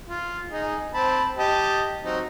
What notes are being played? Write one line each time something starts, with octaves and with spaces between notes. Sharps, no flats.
F4
D#4 G#4
C4 A5 B5
G4 D#5 A5
F#3 C4 D#4